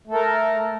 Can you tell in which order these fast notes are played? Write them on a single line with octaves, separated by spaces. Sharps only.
A3 A4 A#4